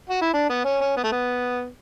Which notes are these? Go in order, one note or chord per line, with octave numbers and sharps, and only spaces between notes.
F#4
E4
D4
B3
C#4
C#4
B3
A3
B3